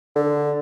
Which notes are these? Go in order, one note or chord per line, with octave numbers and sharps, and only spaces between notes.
D3